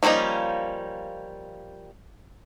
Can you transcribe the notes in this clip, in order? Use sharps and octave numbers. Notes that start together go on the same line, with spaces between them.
F3 G3 A#3 C#4 D#4